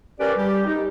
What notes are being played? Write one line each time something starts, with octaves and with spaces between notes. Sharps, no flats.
C#4 G4 A#4 B4 D5
G3 G4
D#4